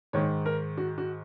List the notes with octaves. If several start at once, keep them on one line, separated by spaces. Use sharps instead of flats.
G#2 D#3 C#5
A#4
F#4
F#4